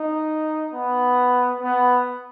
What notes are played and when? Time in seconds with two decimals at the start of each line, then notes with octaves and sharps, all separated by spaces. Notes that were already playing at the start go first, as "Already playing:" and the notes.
Already playing: D#4
0.73 B3
1.61 B3